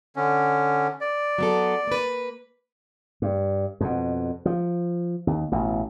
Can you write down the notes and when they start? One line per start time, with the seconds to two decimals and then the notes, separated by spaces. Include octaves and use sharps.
0.16 D3 C#4
1.01 D5
1.38 F#3 B3 A4
1.87 A#3 B4
3.22 G2
3.81 F2 B2
4.45 F3
5.27 D#2
5.52 A1 B2